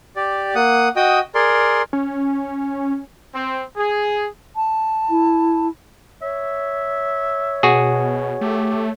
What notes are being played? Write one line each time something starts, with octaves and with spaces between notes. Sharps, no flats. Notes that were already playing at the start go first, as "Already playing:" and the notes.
G4 D5
A#3 F#5 D#6
F#4 D#5 G5 D#6
G#4 A#4 D5 C6
C#4
C4
G#4
A5
E4
C#5 E5
B2 F#4 G#4
A3 G4